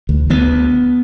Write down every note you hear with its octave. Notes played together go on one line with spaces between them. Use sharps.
D2
D2 B3